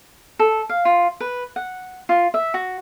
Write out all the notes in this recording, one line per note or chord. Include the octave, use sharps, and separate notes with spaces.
A4
F5
F4
B4
F#5
F4
E5
F#4